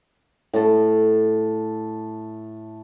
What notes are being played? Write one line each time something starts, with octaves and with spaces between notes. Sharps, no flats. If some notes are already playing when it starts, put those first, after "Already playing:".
A2 A4